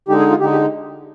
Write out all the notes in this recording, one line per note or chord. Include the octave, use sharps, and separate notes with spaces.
D3 G#3 D#4 G4
G#4
F4
D3 G#3 D#4 G4
G4